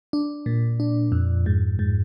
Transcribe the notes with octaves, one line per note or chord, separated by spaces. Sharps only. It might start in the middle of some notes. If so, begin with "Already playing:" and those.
D4
A#2
D4
F2
G#2
G#2